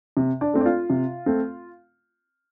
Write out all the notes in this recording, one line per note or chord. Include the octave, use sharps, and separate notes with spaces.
C3
D4 D5
A3 C4
D5
F4 F5
C3
A3 C4